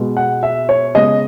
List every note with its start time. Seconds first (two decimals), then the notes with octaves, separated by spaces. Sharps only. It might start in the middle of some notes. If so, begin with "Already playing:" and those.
Already playing: B2 G#3 B3
0.17 F#5
0.43 E5
0.69 C#5
0.95 C#3 G#3 B3 D#5